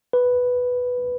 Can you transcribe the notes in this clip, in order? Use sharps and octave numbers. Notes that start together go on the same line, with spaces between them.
B4